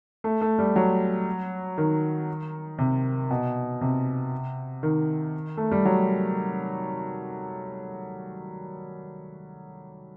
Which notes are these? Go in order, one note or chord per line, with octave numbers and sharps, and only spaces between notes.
A3
A3
G3
F#3
D#3
C3
B2
C3
D#3
A3
G3
F#3